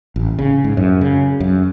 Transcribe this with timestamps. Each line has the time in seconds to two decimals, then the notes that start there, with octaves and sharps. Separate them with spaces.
0.16 A1
0.39 C#3
0.64 G#2
0.77 F#2
1.01 C#3
1.40 F#2